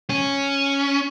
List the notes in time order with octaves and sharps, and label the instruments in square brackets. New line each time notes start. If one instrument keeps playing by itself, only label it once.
[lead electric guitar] C#4